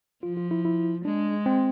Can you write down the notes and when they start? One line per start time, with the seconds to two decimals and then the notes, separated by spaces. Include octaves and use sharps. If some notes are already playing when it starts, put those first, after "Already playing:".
0.23 F3 F4
0.37 F4
0.51 E4
0.65 E4
1.05 G#3 D4
1.46 C4